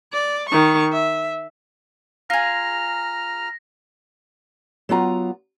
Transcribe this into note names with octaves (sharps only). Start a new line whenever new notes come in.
D5
D#3 C#6
E5
F4 G#4 A#5 F6 A#6
F#3 B3 F4 A#5